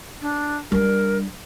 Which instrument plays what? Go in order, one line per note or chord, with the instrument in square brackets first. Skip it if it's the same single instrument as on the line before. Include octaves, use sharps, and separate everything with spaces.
[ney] D4
[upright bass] G3 D4 [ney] A#4